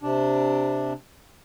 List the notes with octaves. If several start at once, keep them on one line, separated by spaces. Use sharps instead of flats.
C3 D4